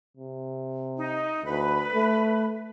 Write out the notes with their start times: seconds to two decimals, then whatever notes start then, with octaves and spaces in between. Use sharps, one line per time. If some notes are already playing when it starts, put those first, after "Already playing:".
0.17 C3
0.97 D#4
1.44 D2 B4
1.95 A3